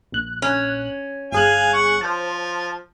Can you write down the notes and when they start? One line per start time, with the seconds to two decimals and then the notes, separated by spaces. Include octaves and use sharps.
0.12 A#1 F#6
0.42 C#4
1.32 G1 G#4 F5 G#5 F#6
1.74 F#5 C#6
2.01 F3 C5 A5